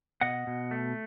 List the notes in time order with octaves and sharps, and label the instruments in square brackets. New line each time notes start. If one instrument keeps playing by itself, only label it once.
[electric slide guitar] B2 D#5 F#5
B2
A3